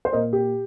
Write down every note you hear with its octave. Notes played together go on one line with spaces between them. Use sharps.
C5
A#2 A#3 A#4 D#5
G4